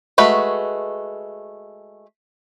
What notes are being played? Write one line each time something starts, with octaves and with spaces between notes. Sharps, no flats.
G#3 A3 F#4 B4